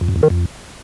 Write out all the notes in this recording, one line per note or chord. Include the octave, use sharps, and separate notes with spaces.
F2
F#2
E2
D#3
F2